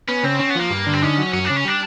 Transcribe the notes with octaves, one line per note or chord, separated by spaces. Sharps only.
B3 C#4
C#3 C4
C4 C#4
B3
F3
A#3
G2
D3
C4
C#4 D#4
F#3
F#2 C#4
C#3 D4
C#4
G3 D4